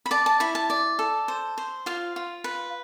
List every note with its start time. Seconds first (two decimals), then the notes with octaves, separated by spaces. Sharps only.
0.06 B5
0.11 D5 A5
0.26 A5
0.40 E4 B5
0.55 A5
0.70 D5
0.99 A4
1.28 C5
1.58 C5
1.86 F4 F5
2.16 F4
2.44 B4